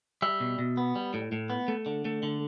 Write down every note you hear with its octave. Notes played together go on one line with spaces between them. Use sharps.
G3 E5
B2
B2
B3
G3
A2
A2
B3
A3
D3
A3
D3